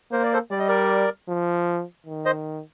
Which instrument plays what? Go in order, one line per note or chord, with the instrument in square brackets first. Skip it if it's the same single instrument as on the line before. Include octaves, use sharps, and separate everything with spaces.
[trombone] A#3 [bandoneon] C5
[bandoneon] D5
A4 C5
[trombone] G3 [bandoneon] D5
[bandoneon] D#5
A#4 D5
[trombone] F3
D#3
[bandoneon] C5 D#5